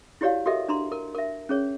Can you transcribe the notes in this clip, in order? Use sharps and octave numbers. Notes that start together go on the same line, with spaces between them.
E4 F#4 G4 C#5 D5 F5
F#4 G4 A4 A#4 D#5 E5
D4 A#5 C6
A#4
A#4 E5
C#4 G#4 C#5